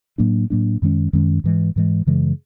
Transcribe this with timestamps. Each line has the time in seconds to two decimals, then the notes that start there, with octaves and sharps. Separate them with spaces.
0.18 A2 F#3 A#3 D4
0.50 A2 F#3 A#3 D4
0.82 F#2 D#3 G#3 C#4
1.13 F#2 D#3 G#3 C#4
1.44 G#2 E3 G#3
1.76 G#2 E3 G#3
2.06 F#2 C#3 E3 G#3